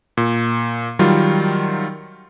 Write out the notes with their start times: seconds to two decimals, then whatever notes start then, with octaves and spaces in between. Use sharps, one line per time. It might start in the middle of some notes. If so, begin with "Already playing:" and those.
0.17 A#2
0.99 D#3 F#3 G3 F4